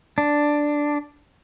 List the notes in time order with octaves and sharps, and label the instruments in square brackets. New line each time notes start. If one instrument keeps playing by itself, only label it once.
[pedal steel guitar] D4